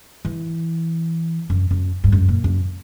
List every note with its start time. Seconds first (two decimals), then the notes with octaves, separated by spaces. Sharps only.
0.25 E3
1.50 F#2
1.71 F#2
2.04 G2
2.12 F#2
2.28 A#2
2.44 F#2